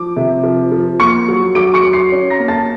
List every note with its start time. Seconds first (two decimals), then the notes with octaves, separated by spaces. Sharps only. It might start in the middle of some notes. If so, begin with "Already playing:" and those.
Already playing: F3 D6
0.17 C3
0.44 F3
0.72 F3
1.00 A#3 C#6 C#7
1.28 F#3
1.55 F#3 D6 D7
1.74 C#6 C#7
1.83 F#3
1.93 C6 C7
2.12 C#4
2.30 A#5 A#6
2.39 A#3
2.48 A5 A6